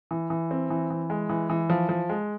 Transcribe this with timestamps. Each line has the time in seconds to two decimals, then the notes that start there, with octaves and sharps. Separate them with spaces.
0.11 E3
0.30 E3
0.51 C4
0.70 E3
0.90 E3
1.10 G#3
1.29 E3
1.50 E3
1.70 F3
1.89 F3
2.09 G#3